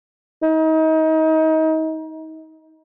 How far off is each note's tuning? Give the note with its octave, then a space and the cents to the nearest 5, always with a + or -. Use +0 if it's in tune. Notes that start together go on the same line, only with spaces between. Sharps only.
D#4 +30